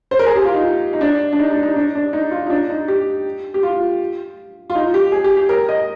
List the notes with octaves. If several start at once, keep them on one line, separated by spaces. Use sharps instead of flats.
C5
A#4
G#4
G4
F4
D#4
D#4
D4
D4
D#4
D4
D#4
D4
D4
D#4
F4
D#4
D4
D#4
G4
G4
F4
F4
D#4
G4
G#4
G4
G4
A#4
D#5